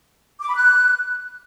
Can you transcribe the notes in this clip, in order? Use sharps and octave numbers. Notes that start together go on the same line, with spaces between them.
D6
B5
F#6